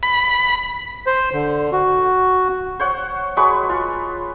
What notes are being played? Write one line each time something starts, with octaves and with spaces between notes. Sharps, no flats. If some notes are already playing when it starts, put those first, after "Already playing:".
B5
C5
D3
F#4
C5 C#5 F#5
F#3 G#3 B4 C#6
F4